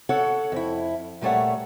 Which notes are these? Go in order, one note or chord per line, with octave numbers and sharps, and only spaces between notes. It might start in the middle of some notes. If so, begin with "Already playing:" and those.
A4 C#5 F#5
F2 E4
A#2 G3 A3 C#5 F#5